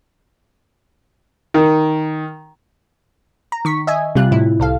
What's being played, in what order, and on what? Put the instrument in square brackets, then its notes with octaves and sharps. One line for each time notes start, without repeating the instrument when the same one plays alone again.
[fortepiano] D#3
[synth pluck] A#5
D#3 C#6 B6
D#5 E5 G#5
C3 G3 F4 F#6
A2 C3 E4
C2 A4 F5